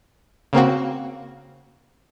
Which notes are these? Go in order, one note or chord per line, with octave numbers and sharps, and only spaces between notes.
C#3 A#3 C4 F#4